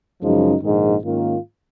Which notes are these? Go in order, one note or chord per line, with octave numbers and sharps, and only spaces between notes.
F#2 C#3 F3 G#3 D#4
A#1 G#2 D#3 G#3 D#4
G#2 D#3 A#3 C#4 F4